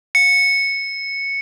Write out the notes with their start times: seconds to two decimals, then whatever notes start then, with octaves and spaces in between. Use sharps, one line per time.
0.15 C#7